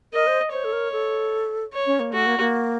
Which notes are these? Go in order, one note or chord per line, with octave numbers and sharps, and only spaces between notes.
A#4 D#5
C5
C5 C#5
A4
A#4
A4
C#5
C#4
A#3
A3 F#4
A#3
A#3